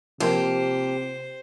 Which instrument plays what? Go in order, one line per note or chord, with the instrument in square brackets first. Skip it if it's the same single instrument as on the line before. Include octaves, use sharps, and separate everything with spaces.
[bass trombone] C3 [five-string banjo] F3 A#3 [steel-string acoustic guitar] G4 [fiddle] C5